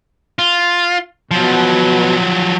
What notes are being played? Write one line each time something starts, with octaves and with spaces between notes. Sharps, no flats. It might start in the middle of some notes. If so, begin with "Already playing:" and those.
F4
B2 F3 F#3